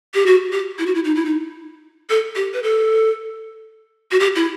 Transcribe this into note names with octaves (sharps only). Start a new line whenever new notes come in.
G4
F#4
G4
E4
F#4
E4
D#4
E4
D#4
A4
G4
B4
A4
F#4
G4
E4